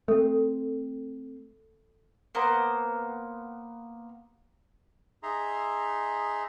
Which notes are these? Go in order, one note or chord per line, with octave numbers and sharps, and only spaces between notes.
A3 C4 A4
A#3 B3 C5 A#5
D#4 G#4 E5 A#5 C6